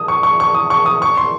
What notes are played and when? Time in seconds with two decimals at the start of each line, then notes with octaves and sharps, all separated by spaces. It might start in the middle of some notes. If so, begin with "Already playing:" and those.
Already playing: D#6
0.08 C#6
0.23 C#6
0.40 C#6
0.54 D#6
0.70 C#6
0.86 D#6
1.02 C#6
1.17 C6